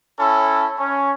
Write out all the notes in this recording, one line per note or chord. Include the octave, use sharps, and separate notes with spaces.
C#4 E4 A4
C#4